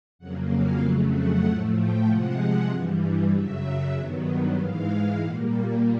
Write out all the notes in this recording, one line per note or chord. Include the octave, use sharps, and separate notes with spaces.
F2 C#3 F#3 A#3 F#5
F5
F2 C#3 F#3 A3 F#5
F#5
A2 F3 A3 F#5
G5
C3 F3 G#3 F#5
G2 E3 G3
F#2 C#3 F#3 E5
G2 D#3 F#3 B3
G#2 E3 G#3 F5
A#2 G3 A#3 F#5